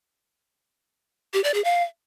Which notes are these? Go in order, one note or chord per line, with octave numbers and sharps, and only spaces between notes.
G4
D5
G#4
F5